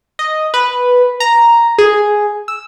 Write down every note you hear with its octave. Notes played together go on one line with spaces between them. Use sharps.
D#5
B4
A#5
G#4
E6